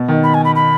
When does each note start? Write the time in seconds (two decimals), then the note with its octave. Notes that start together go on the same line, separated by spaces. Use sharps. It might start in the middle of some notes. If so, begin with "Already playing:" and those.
Already playing: B2
0.08 D#3
0.24 B5
0.34 G#5
0.45 B5
0.55 B5